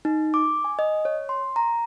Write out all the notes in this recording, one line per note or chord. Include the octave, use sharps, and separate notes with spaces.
D#4
D6
G#5
D#5
C#5
C6
A#5